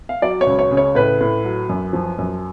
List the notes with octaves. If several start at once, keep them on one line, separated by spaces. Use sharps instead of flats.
F5
F#3 D5
C#5
C#2
C#5
C#3
C#5
A2 B4
A2
F#3
F#2
F3
F#2